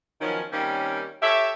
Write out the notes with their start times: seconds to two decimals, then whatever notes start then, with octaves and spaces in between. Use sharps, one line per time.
0.21 D#3 F3 F#3 B3 C#4
0.52 D#3 G3 A#3 C4 C#4
1.22 G4 A4 C#5 E5